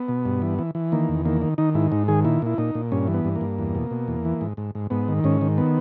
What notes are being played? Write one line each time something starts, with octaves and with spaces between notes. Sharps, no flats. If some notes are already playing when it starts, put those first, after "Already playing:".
Already playing: B3
B2
G2
E3
E3
E3
D#3 A#3
E2
D#3 A#3
D#3
D#3 D#4
G#2 E4
G#2 D#4
D#3 G#4
A#2 E4
A#2 E4
A#2 D#4
A#2
G2 C#4
E3
B3
G2
A#3
G2
E2
B2
B2
E2
E3
G#2
G#2
G#2
G#2 B3
D#3
G#2 C#4
D#3
B3